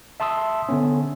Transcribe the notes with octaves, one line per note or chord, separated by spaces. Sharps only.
E5 A5 C6 D#6 E6
D3 B3 C#4